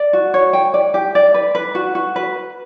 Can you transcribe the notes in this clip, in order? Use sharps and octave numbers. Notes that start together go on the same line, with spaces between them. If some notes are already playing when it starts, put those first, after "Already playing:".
Already playing: D5
F#4
C#5
G5
D5
G4
D5
B4
B4
F#4
F#4
B4